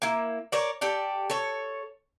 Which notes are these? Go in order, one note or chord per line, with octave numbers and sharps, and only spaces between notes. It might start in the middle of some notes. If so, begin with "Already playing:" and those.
A#3 E4
A#4 C#5 D5
G4 A4 D5
A4 C#5